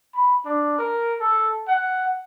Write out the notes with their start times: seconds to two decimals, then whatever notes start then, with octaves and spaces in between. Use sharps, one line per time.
0.14 B5
0.45 D4
0.78 A#4
1.20 A4
1.68 F#5